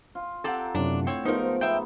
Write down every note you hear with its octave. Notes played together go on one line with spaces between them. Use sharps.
F4
C4 G4 A4 F#5 A#5
F#2 A2 C3 D4
C4 C#5
G#2 F3 A3 B3 D#4 A#4 C5
B3 D#4 C5 E5 G5